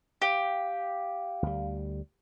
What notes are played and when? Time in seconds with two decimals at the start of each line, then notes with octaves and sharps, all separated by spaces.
0.22 G4 F5
1.42 D2 G3